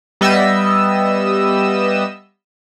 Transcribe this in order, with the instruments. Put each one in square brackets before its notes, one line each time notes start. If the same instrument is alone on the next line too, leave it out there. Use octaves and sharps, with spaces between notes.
[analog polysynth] G3 B3 D#5 E5 E6